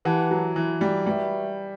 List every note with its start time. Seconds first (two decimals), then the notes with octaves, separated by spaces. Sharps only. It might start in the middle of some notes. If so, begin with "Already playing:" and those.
0.05 E3 G4 B4 F#5 A5
0.31 F#3
0.56 E3
0.81 G3
1.06 G3 F#4 B4 E5